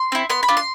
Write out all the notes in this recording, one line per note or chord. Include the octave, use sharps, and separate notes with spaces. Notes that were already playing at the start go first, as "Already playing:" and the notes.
Already playing: C6
C4 E4
B3 C6
B5
D4 F4
C6